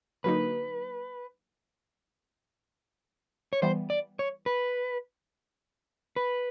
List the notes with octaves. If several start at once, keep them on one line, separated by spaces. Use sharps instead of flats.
D3 F#3 A#3 D#4 B4
C#5
E3 G3 B3 C5
D5
C#5
B4
B4